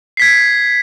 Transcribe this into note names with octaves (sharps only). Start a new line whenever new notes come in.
G#6 B6 C7